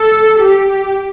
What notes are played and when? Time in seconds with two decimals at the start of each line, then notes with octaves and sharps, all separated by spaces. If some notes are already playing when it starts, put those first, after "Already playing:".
Already playing: A4
0.40 G4